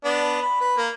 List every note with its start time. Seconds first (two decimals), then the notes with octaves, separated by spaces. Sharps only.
0.04 B3 D4
0.42 B5
0.60 B4
0.78 A#3